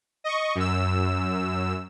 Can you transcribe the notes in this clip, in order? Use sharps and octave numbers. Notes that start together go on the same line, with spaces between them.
D#5 C#6
F#2 E6